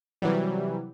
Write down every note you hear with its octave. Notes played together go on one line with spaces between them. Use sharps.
C3 E3 F#3 G3